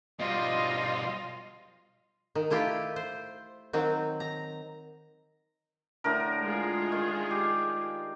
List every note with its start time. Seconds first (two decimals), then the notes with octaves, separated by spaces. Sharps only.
0.19 B2 G3 F4 C5 D#5
2.35 D#3
2.50 A3 E4 F4 G4
2.96 C5
3.73 D#3 F#3 C4
4.20 A#5
6.04 A2 D3 A#4
6.42 G#3 F4 G#4
6.92 D#3
7.31 G4